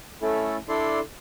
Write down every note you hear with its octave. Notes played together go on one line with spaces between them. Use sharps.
A3 C#4 E4 A4
D4 E4 A4 D5 C6